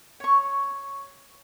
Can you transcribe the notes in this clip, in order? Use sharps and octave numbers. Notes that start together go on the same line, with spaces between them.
C#5 C#6